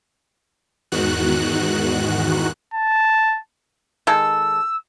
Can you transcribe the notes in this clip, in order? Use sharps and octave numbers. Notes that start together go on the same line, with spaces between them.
E2 G#2 D#3 F#4 F#6
A5
D#3 G#3 A4 E6